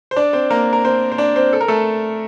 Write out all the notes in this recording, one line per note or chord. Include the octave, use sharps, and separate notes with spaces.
C5
D4 D5
C4 C5
A#3 A#4
A#4
C4 C5
C5
D4 D5
C4 C5
A4
A#4
A3 A4